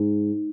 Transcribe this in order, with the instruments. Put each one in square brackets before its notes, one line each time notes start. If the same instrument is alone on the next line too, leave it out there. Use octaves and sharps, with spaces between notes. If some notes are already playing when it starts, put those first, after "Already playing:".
Already playing: [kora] G#2